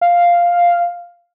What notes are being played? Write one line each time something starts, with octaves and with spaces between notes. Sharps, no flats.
F5